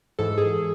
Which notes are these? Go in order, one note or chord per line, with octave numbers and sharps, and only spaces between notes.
G#2 E3 A4
G#4